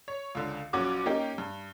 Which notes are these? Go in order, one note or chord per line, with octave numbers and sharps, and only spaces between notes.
C#5
C#2 D3
A#1 F#3 C#4 F#4 D6
A#3 C#4 D#4 G4
G2